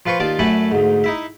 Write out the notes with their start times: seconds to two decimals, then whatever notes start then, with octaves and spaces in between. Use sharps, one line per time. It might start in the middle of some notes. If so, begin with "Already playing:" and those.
0.06 F3 F4 B4 C5 C#6
0.20 D#2 F4 D5 A5
0.39 F#2 A3 D4 A4 G#5 B5
0.72 D2 G#2
1.04 D#4 E4 E5